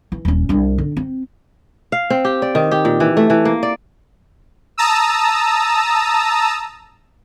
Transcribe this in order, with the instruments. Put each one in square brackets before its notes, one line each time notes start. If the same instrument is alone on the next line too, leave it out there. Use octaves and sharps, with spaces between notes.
[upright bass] E3
D#1 C#4
C2 D4
D3
C4
[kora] F5
C4
G4
D5
D#3
G4
A#2
E3
A3
E3
A#3
D5
[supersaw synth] A5 A#5 D#6 E6